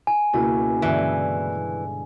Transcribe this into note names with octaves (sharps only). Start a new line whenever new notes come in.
G#5
C#2 B2 A#3 E4 F#4 D#7
G2 D3 E3 G#3